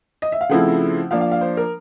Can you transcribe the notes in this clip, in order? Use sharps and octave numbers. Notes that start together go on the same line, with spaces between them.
D#5
E5
F5
C#3 F3 A3 C4 E4 F#5
F3 A#3 D4 F5
F5
F5
C5
A#4